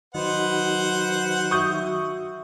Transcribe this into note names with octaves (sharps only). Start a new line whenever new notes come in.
D#3 F#3 B4 C5 D#5 F#5
F#4 E5 C#6 D#6 G6